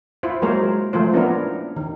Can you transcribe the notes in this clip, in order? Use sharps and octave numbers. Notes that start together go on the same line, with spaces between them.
E4 F4 C5
F#3 G#3 A#3 A#4 C5 C#5
F3 A3 F4 C5
A#3 B3 C#4 D4 E4 A#4
D#3